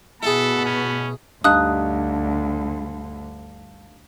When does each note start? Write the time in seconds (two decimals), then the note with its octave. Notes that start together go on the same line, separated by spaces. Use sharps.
0.23 B2 E4 G#4 A4 F#5 A5 B5
0.65 C#4
1.44 D2 G2 D#4 F5 A5 D#6 F#6